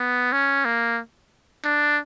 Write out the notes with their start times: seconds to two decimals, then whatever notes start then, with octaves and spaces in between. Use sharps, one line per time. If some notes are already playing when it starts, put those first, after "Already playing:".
Already playing: B3
0.32 C#4
0.65 A#3
1.64 D4